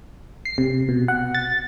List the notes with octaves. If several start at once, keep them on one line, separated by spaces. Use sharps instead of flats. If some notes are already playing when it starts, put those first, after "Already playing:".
C7
C3
B2
F#5
A6